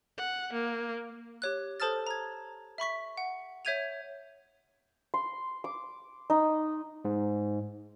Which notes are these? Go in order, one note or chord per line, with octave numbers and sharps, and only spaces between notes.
F#5
A#3
G4 C#5 F#6
A4 C5 A5 D#6 F6 A6
A#5 G#6
E5 B5 C#6 B6
F#5
C#5 E5 G6 G#6 D#7 F7
C6
D6
D#4
G#2